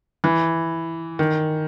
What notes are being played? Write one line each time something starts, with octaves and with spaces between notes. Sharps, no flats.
E3
D#3